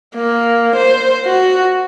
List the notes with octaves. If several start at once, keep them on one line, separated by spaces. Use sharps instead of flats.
A#3
C5
F#4